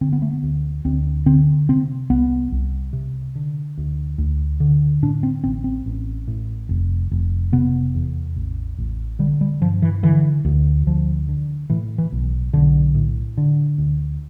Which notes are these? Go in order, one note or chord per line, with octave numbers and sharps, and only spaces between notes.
D3 C4
B3
A3
B3
D2
D2 C4
D3 C4
C3 C4
C2 B3
C2
C3
D3
D2
D2
D3
A2 D4
C4
A1 C4
C4
A1
A2
F1
F1
C3 B3
E2
A1
A1
D3 G3
G3
G2 F3
E3
D3 E3
D2
D2 F3
D3
A2 E3
E3
B1
B1 D3
A2
D3
D2